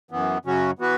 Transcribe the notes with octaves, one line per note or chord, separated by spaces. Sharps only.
F#2 E3 B3
F#2 C#3 F#3 C#4 F#4
E3 B3 F#4 B4